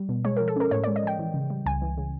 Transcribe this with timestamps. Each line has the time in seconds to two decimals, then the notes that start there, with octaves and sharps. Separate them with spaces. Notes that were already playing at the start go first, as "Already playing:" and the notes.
Already playing: G3
0.09 B2
0.25 G#3 C#5
0.37 F3 A#4
0.48 A4
0.56 C#4 A#4
0.71 A2 C#5
0.84 G#3 D5
0.96 D#5
1.03 F3 G5
1.19 E3
1.34 C#3
1.50 G3
1.66 C#2 G#5
1.82 E3
1.98 C#3